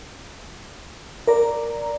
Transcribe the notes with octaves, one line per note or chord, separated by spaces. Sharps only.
A#4 D5 A#5